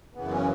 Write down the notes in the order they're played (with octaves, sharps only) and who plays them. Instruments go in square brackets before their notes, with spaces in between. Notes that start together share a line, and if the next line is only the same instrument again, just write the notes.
[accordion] F#2 C#3 E3 B3
C#4